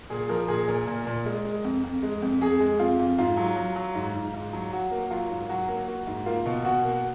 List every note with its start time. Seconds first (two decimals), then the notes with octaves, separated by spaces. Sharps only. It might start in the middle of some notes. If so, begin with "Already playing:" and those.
0.10 A#2 G#4
0.29 F3 A#4
0.48 A#2 G#4
0.68 A#2 A#4
0.87 A#2
1.07 A#2
1.26 G#3
1.45 G#3
1.64 F2
1.83 F2
2.03 G#3
2.22 F2
2.41 F2 G#4
2.60 G#3
2.79 F2 F4
2.99 F2
3.18 G#2 F4
3.37 F#3
3.56 F#3
3.76 F#3
3.95 G#2
4.15 G#2
4.34 G#2
4.53 F#3
4.73 F#3 F#4
4.91 A#3
5.11 F#3 F4
5.30 G#2
5.49 F#3 F#4
5.68 A#3
5.88 A#3 F#4
6.07 G#2
6.26 A#3 F4
6.46 B2
6.65 B2 F#4
6.84 A#3